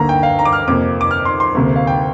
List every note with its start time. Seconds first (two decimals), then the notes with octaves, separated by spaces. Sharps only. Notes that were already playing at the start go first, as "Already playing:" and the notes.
Already playing: D2 D3 A#3 A#5
0.09 G5
0.23 F5
0.39 A#5
0.45 D6
0.53 F6
0.68 F2 C3 A#3 D6
1.01 D6
1.11 F6
1.25 C6
1.40 C6
1.55 D2 C3 A#3
1.76 F5
1.87 G5